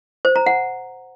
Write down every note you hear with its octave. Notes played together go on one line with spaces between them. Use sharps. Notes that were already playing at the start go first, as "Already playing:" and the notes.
C5
A#5
F#5